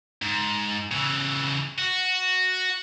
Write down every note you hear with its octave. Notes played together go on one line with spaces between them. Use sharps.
G#2
C#3 E3
F#4